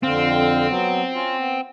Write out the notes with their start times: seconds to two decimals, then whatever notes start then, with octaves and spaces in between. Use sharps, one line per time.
0.03 F2 D3 C4 F5
0.69 F#3 B3
1.15 C#4 F4
1.38 B3